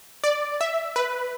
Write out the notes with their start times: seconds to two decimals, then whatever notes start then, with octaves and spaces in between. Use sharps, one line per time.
0.24 D5
0.61 E5
0.96 B4